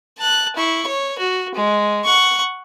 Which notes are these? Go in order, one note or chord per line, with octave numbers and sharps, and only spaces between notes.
A5 F#6
E4 C#6
C#5
F#4
G#3
F#5 C#6